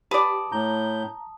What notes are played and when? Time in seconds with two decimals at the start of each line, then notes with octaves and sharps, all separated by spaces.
0.11 G4 B4 D5 A5 D#6
0.52 A2 A#5 G6